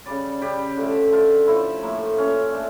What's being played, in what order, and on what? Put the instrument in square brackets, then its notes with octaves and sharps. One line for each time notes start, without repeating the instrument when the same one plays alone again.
[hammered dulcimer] C#3 G3 D5
C#3 G3 G4
D3 F3 A3
D3 F3 A3 F4
A2 F3 A3 E4
A2 F3 A3 A#3
A#2 A3 C#4
A#2 A3 D4